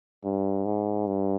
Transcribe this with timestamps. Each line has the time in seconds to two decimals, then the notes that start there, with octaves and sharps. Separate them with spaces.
0.24 G2
0.65 G#2
1.07 G2